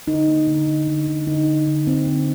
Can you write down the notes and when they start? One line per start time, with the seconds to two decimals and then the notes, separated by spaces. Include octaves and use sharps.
0.07 D3 D#4
0.27 A#3
0.47 D3
0.67 D3
0.87 D3
1.07 D3
1.27 D3 D#4
1.47 D3
1.67 D3
1.87 A#3 C4
2.07 D3